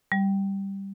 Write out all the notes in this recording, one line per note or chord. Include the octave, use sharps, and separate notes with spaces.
G3